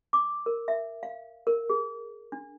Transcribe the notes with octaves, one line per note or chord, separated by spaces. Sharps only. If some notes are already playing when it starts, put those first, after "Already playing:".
D6
A#4
E5
F5
A#4
G#4
D4